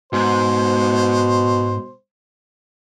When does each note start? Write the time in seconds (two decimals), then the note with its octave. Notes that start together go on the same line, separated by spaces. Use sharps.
0.13 G#2 B2 C5